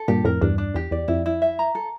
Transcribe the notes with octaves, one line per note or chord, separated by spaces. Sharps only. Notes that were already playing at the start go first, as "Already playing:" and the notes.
Already playing: A4
G2 A#2 G4
F2 A2 A#4
E2 G2 D4
D4
E2 G4
E2 D5
F2 E4
E4
E5
A#5
A4